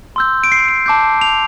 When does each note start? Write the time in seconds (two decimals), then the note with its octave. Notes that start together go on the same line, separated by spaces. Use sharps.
0.16 C6 E6 G6
0.44 D7
0.52 C7
0.69 D7
0.86 A5 D6 G6
1.21 F7